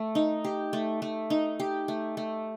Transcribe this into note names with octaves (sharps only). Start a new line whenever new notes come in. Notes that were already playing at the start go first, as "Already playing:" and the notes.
Already playing: A3
D#4
G4
A3
A3
D#4
G4
A3
A3